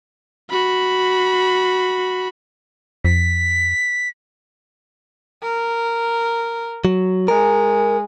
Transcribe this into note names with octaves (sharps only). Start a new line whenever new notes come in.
F#4 B5
F2 B6
A#4
F#3
G#3 A#4